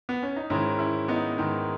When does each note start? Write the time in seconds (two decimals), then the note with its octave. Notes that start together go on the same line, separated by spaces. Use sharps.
0.09 B3
0.23 C#4
0.36 D#4
0.50 G#2 D#3 C#4 E4
0.79 C#4 E4
1.08 B3 D#4
1.38 G#2 D#3